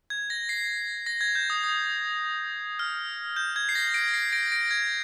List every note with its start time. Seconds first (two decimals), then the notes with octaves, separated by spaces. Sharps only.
0.10 G#6
0.30 A#6
0.49 C7
1.06 A#6
1.21 G#6
1.35 G6
1.50 D#6
1.64 D#6
2.79 F6
3.36 G6
3.56 G#6
3.69 C7
3.75 A#6
3.94 A#6 D7
4.14 C7
4.33 A#6 D7
4.52 A#6 D7
4.71 G#6